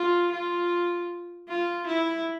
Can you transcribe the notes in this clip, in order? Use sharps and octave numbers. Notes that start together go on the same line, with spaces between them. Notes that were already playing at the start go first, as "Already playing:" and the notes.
Already playing: F4
F4
F4
E4